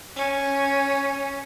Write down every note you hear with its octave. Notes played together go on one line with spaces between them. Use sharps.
C#4